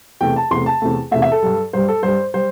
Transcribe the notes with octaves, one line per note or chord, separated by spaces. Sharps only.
E2 C3 A3 G5
A5
E2 C3 A3 C6
A5
E2 C3 A3
E2 C3 A3 E5
E5
A4
G2 G3
G2 G3 C5
A4
G2 G3 C5
G3 C5